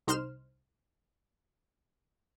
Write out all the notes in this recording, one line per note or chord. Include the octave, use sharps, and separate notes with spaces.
C2 D#4 C5 C6 F6 E7